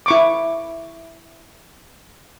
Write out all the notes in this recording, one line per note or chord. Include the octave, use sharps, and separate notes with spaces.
E4 C#6 D6